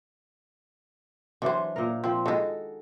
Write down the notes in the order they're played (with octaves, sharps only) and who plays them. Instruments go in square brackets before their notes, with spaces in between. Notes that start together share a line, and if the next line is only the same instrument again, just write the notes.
[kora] E3 D4 [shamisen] F#3 C5
[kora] A#2 A#4
[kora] F3 [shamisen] C4
[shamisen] D#3 G#3 [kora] F#4 A4